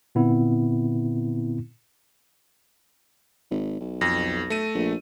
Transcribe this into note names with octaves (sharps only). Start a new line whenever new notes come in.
A#2 D3 B3 C4 E4
G#1
B1
F2 A#6
A3 D#7
A#1